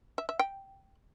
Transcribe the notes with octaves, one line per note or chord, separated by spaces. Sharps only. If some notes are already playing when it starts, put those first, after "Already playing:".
E5
E5
G5